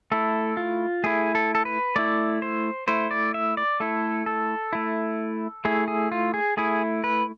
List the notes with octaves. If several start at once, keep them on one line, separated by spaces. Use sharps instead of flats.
A3 E4 A4
F4
A3 E4 G#4
A4
A4
B4
A3 E4 D5
C5
A3 E4 C5
D5
E5
D5
A3 E4 A4
A4
A3 E4
A3 E4 G#4
G#4
F4
G#4
A3 E4 G#4
B4